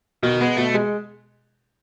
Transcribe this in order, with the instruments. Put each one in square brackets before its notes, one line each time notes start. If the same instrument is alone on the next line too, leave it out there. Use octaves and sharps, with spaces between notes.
[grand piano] B2 [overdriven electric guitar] D#3
[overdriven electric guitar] G#3 [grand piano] B3
[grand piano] B2 [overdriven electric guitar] A3
[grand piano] G#3